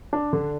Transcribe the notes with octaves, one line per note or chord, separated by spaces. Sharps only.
D4
D3